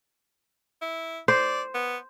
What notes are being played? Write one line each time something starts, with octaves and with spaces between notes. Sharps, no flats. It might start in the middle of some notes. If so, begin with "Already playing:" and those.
E4
C5 D5
B3